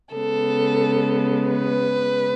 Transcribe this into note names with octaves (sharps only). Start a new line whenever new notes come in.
C#3 G#3 B3 A4
B4